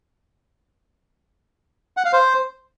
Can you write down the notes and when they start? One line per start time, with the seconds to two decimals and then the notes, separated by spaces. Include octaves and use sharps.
1.97 F#5
2.05 F5
2.13 C5